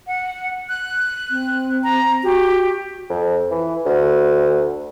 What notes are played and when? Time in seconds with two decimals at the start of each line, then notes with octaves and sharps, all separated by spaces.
0.07 F#5
0.69 F#6
1.31 C4
1.84 A#5
2.23 F#4 G4
3.10 F2
3.51 E3
3.86 D2